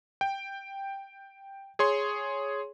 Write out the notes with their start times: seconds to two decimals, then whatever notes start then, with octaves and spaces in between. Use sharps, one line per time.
0.21 G5
1.79 G#4 C#5 C6